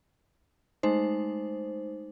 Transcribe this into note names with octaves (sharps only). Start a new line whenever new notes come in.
G#3 A3 D#4 C5